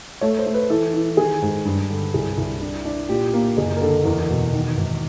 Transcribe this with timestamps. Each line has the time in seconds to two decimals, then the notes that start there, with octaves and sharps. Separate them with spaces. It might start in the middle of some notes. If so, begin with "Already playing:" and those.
0.21 A3 C#5
0.38 C5
0.46 A3
0.54 B4
0.70 E3 A4
0.94 E3
1.17 D#3 G#4
1.42 G#2
1.65 G2
1.90 D3
2.14 C2 G#4
2.37 C2
2.61 D4
2.85 D4
3.09 A#2 G4
3.34 A#3
3.57 F#1 G#4
3.77 A#4
3.81 D3 A4
4.05 E2 A#4
4.30 B2
4.53 D#3
4.77 G#1